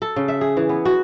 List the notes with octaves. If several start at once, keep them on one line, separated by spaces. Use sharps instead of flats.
A4
C#3
E5
G#4
E3
B3
F#4